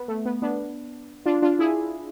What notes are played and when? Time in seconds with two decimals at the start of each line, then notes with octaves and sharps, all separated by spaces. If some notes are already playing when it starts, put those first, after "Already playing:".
Already playing: B3
0.08 A3
0.26 B3
0.42 B3 D4
1.26 D4 F4
1.42 D4 F4
1.59 E4 G#4